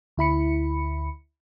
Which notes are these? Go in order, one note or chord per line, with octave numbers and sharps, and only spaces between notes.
D2 E4 B5 C#7